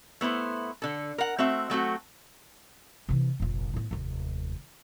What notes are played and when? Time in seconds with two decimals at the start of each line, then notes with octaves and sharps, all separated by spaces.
0.21 A3 B3 E4 C5
0.82 D3 A4
1.18 A#4 F#5
1.38 A3 C4 F#4 E5
1.70 F#3 A3 C4 F#4
3.09 C3 E3
3.40 F1 A#1
3.74 A2 B3
3.91 F1 D#2